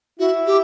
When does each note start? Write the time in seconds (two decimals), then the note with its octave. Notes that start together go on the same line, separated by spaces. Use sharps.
0.19 E4 F#4
0.47 G4